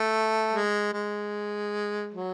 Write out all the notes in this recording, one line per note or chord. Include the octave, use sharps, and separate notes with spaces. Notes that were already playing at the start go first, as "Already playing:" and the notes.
Already playing: A3
G#3
G#3
F#3